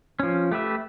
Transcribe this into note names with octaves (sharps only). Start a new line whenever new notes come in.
F3 C#4
A3 G4 B4 E5